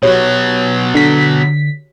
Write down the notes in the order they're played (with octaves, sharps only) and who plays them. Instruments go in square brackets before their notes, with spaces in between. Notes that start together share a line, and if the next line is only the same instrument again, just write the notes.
[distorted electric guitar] B2 F#3 [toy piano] F#4 G4 C#5
[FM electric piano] D3 B6